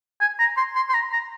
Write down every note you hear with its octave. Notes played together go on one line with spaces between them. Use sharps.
G#5
A#5
C6
C6
C6
A#5
A#5